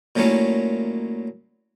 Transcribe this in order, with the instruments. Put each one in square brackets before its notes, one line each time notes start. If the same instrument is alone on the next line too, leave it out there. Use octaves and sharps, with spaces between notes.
[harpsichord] A#2 F#3 A3 A#3 C#4 E4